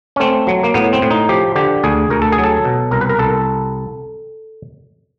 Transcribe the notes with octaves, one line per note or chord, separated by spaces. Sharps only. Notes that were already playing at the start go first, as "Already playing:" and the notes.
C#4
A3 C4
F#3
A#3
A2 B3
C4
A2
D#4
F3 G4
D3 G4
D2 G#4
D2 A#4
A4
G#4
F#3
A4
B2
C2 A#4
B4
A#4
C2 A4